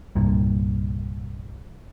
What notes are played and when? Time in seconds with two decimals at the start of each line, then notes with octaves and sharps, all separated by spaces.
0.15 C2 G2 A#2